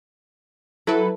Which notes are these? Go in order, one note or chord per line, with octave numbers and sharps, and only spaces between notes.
F#3 E4 A4 B4